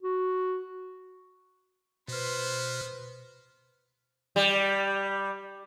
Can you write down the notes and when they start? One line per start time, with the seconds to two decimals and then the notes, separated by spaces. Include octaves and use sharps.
0.03 F#4
2.08 B2 B3 B4 C5 F6
4.36 G3